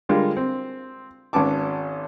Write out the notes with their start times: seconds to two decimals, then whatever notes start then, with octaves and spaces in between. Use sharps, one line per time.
0.09 D3 G3 G#3 F4 A#4
0.37 C4
1.33 G#1 C#4 B4 A5 D6